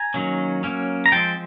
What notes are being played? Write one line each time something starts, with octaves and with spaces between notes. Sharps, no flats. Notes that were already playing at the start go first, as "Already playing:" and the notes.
Already playing: G#5 A#5
D#3 F#3 A#3 C#4
F#3 A#3 C#4
A#5
F3 G#3 C4 G5 A5